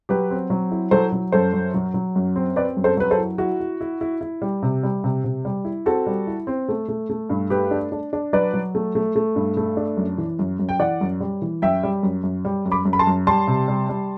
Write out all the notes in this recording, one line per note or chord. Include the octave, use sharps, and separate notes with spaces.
F#3 G4 B4
C4
F#3
E4
F#3 A4 C5
F#3
F#2 A4 C5
F#3
F#3
F#3
F#2
C4
C4 B4 D5
F#2
A4 C5
F#3 B4
A4 C5
E4
E4 F#4
E4
E4
E4
E4
G3
C3
G3
C3
C3
G3
E4
C4 F#4 A4
G3
E4
C4
A3
A3
A3
G2
A3 G4 B4
D4
D4
D4
F#3 B4 D5
F#3
A3
A3
A3
G2
A3
D4
F#2
E3
F#2
F#2
G5
E3 D5 F#5
F#2
G3
E3
F#2 E5 G5
G3
F#2
F#2
G3
F#2
B5 D6
F#2
B5
A5 C6
F#2
G3 A5 C6
C3
G3
G3